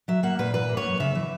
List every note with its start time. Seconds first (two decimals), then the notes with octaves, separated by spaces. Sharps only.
0.08 F#3 E5
0.23 A#3 F#5
0.39 A#2 B4
0.54 E3 B4
0.69 A#3
0.77 C#5
0.85 F#2
1.00 C#3 E5
1.15 E3